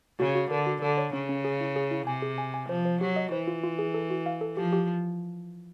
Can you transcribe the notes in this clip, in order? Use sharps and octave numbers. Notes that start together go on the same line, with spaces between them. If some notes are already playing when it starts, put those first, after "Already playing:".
C#3 F#4
F#4
D3 A#4
F#4
D3 A4
C#5
C#3 C#4
C#4
G#4
E4
G#4
E4
C3 G#5
G#4
G#5
G#5
F3 C5
C5
F#3 G4
D#5
E3 C5
F4
F4
G#4
A4
F#4
F5
A4
F3 G4
G4